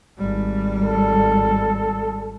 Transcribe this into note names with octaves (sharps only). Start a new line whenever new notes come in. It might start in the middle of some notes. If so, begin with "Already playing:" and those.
G#1 G3
A4